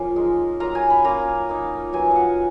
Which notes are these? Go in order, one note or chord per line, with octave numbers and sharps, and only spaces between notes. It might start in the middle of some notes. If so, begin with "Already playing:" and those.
Already playing: F3 A#3 C#4 F4
G#3 D#4
F#3 A#3 F4 A#5
G#5
B5
A#3 C#4 F4 A#5
A#3 D#4
F#3 B3 F4 G#5
F5 F#5